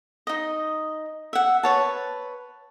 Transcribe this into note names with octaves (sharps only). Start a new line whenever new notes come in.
D#4 D#5
E5 F#5
B4 C#5 A5